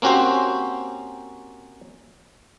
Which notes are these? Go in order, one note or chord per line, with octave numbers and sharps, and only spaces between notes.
A#3 C4 C#4 F#4 G4 C5